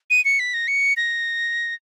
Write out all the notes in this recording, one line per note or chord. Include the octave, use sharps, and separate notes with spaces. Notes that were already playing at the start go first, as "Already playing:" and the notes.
D#7
C#7
B6
A#6
C#7
A#6